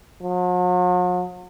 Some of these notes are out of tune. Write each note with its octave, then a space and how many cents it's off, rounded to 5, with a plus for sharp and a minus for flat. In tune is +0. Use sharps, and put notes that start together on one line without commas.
F#3 -45